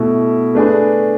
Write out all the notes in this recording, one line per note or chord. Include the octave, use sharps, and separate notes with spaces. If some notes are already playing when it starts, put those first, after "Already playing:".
Already playing: B2 A3 E4
A3 D4 G#4 B4